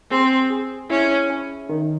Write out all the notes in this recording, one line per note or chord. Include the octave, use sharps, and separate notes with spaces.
C4 G#4
G#4
C#4 E4
C#4
D#3